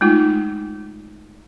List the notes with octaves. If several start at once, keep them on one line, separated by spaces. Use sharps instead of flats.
G#3 A3 D#4 F4